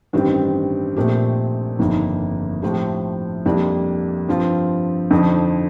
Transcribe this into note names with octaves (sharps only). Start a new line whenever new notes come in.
A1 G2 D#3 G3 C4
A#1 A#2 A3 C4 G4
G1 F2 D#3 A#3 D#4
A2 F3 A3 C4 G4
F2 C3 G3 A#3 D4
G2 F3 C4 F4
F2 D3 F3 C4 D#4